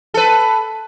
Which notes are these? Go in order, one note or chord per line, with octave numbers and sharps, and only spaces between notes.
A4 B4